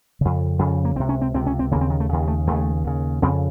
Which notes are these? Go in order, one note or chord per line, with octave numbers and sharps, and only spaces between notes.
F2 C#3
F2 C#3
A#3
C#2 C3 C4
C#4
C4
C#2 C3 C4
C#4
C4
D#2 C#3 A#3
C4
D#3
A3
D#2 C#3
A3
D#2 C#3 A3
D#2 C#3
F2 C#3 C4